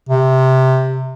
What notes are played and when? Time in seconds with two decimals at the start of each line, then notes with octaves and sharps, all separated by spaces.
0.09 C3